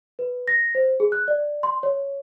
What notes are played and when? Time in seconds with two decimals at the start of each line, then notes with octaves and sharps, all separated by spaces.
0.19 B4
0.48 A#6
0.75 C5
1.00 G#4
1.12 F#6
1.28 D5
1.63 C6
1.83 C#5